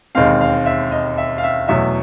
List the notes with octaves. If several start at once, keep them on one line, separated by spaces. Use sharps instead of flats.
E1 D#2 D#3 G#3 C4 F5
F5
E5
D#5
E5
F5
E5
E2 B2 F#3 A3 E5